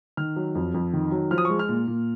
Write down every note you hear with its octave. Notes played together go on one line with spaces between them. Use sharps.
D#3 F6
F#3
F2
F2
D#3
F#3
F3 F6
D#6
G#3 C#6
F6
A#2
A#2